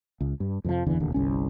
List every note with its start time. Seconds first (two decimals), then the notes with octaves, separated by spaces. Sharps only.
0.21 C#2
0.40 G2
0.64 F2 C3 E3 F3
0.86 F#1 E2 D3 E3
1.00 E1 D#2 D3
1.14 G1 C2 C#4